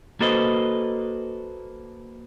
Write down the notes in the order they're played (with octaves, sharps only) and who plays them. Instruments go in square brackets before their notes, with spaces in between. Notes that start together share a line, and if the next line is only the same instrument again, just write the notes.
[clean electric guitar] A#3 F#4 A4 B4 C5 D#5